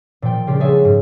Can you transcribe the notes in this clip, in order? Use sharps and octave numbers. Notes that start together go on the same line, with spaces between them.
A#2 F3 G5
C#3 G3 D4 F4 G4
F#3 G#3 G#4 A4 C#5 E5
G#2